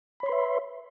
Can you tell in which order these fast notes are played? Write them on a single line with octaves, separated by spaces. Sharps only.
B5 C#5 C6 B4 E5